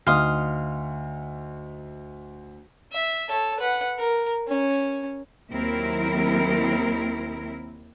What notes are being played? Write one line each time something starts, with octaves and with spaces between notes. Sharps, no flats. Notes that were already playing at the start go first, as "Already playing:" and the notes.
D2 D#4 F5 C6 D#6 F6
E5
A4 C#5
B4 F#5
A#4
C#4
D#2 F#3 C4 E4 A#4